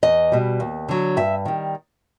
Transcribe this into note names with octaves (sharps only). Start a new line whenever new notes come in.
E2 D#5
B2 G3
D#2
D3 F#3
G2 E5
D#3 G3